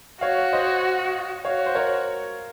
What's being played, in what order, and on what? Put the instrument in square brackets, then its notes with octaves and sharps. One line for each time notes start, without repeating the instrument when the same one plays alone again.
[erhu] F#4 [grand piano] C#5 F5
[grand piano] C5 D#5
[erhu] F#4 [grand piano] C#5 F5
[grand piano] C5
A#4 C#5